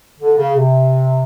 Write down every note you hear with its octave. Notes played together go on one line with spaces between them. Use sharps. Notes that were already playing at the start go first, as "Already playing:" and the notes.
D3
C#3
C3